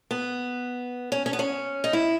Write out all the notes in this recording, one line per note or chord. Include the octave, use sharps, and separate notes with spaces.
B3
C#4
C#4
B3
C#4
D#4
E4